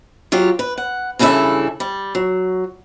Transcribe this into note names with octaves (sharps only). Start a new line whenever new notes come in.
F#3 F4 G4
B4
F#5
G2 C#3 E3 E4 A4 E5
G3
F#3